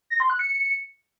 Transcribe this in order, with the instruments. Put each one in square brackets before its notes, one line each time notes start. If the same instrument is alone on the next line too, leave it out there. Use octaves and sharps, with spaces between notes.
[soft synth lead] A#6
C6
F#6
C#7